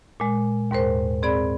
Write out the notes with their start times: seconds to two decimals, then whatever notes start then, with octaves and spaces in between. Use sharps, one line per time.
0.20 A#2 G#3
0.71 D#2 G#2 A#4 C5
1.23 C4 G#4 D5 B5